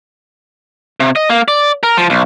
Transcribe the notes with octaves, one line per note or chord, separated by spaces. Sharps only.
C3
D#5
A#3
D5
A#4
F3
B1